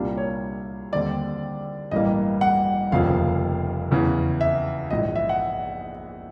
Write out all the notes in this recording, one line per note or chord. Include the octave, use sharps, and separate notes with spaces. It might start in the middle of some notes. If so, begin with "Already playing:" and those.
Already playing: C2 A#2 G3 A#3 D4
C#5
D#2 D3 G3 C4 D5
A1 G2 E3 G3 A#3 D#5
F#5
F1 D#2 C#3 F3 A#3 F5
E2 C#3 E3
E5
A#1 G#2 E3 D#5
E5
F#5